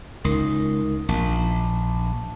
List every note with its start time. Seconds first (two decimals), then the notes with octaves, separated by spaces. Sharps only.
0.24 C#2 D#4 A#4
1.09 A#1 A5